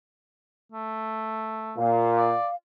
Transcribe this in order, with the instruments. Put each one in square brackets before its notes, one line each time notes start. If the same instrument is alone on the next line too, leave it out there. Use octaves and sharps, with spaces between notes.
[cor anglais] A3
[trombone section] A#2 [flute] F5
[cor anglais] D5